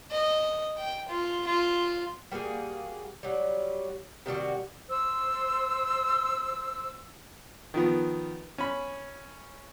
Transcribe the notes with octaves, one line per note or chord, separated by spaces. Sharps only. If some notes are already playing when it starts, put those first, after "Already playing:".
D#5
G5
F4
F4
G3 A#3 F#4 G#4
F#3 G3
C3 D#3 G3 F#4
C5 E6
D#3 F3 B3
C#4 B5